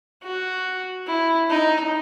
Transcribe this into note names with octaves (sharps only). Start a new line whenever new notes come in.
F#4
E4
D#4